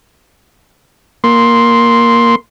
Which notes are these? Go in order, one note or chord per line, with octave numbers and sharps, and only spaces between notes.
A#3 C6